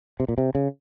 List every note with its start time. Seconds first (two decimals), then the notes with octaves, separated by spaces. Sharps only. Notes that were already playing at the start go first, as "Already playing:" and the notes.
0.20 C3
0.28 A#2
0.38 C3
0.55 C#3